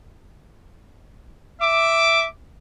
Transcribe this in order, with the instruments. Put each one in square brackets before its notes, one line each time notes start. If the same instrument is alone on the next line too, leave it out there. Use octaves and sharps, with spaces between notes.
[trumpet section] E5 D6